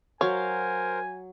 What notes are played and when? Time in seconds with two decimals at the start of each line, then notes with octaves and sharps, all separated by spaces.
0.21 F#3 A#4 C5 C#5 F5 G#5